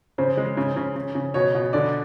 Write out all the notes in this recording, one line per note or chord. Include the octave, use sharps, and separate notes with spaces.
C#3 C5
G#3
C#3
C#3
C#3
C#3
B2 C#5
B2
D3 D5